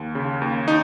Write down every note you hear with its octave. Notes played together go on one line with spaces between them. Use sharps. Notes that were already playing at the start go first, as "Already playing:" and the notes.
Already playing: D#2
C#3
D#2
D#4